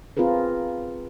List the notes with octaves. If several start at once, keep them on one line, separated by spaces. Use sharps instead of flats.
C4 F4 G#4 A#4 B4